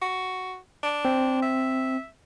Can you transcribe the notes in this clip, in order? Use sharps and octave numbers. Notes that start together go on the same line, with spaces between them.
F#4
D4
C4
E5